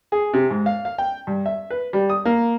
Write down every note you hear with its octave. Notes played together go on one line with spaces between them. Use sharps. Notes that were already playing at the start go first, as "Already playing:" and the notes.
G#4
C3
G#2
F5
F5
G5
G2
E5
B4
G3
D#6
A#3